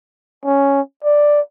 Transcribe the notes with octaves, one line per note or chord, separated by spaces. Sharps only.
C#4
D5